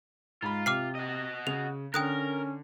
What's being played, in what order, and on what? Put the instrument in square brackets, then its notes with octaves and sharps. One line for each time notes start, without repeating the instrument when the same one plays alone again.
[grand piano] G#2 B5 [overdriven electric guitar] F4
[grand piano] C3 [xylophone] D6 F6 C7
[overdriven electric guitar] F#4 D#5
[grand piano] C#3 [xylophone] F7
[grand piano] D3 [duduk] C#4 [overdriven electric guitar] A#4 [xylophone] G5 D#6 F#6